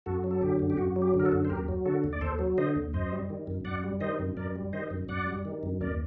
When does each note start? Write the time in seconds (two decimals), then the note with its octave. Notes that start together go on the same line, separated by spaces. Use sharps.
0.06 F#2 F#4 A4
0.24 F#3
0.31 A4
0.42 D3 G4
0.59 F#2
0.70 G4
0.77 F#2 F#4
0.96 F#3
1.02 G4
1.14 D3
1.20 A#4
1.25 F#4 A4
1.32 F#2
1.45 C5
1.49 D#2 G4 A#4
1.68 F#3
1.85 D3 F#4 A4
2.04 D#2
2.13 D5
2.21 D#2 A4 C5
2.39 F#3
2.58 D3 C5 D#5
2.76 D#2
2.93 F#2 C5 D#5
3.12 G3
3.30 D#3
3.47 F#2
3.65 F#2 D5 F#5
3.84 G3
4.00 D#3 C5 D#5
4.19 F#2
4.37 F#2 A#4 D5
4.56 G3
4.73 D#3 C5 D#5
4.91 F#2
5.09 F#2 D5 F#5
5.27 G3
5.45 D#3
5.63 F#2
5.81 D#2 A#4 D5